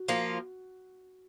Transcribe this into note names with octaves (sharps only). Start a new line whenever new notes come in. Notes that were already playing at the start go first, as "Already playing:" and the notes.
Already playing: F#4
F3 A#3 F4